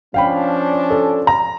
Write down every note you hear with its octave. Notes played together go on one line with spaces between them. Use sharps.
F3 C#4 D4 F5 G5 B5
A4
A#5